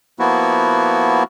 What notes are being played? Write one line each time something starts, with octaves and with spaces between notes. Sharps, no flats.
F3 A#3 B3 E4 F#4